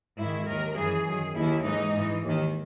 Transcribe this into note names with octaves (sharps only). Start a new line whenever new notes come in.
G#2 D#3 E4
D#2 D#3 A#4
F#2 E3 G#4
F#2 D#3
D#2 D#3 E4
G#2 E3 D#4
G#2 E3
D#2 D#3